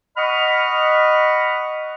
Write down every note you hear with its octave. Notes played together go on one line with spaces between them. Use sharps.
D#5 F#5 B5 C#6 D#6 F6